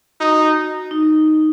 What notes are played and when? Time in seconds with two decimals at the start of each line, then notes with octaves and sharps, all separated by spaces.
0.20 D#4 F#4
0.91 D#4